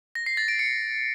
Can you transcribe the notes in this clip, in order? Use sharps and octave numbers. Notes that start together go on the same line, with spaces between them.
A#6
C7
A6
D7
C#7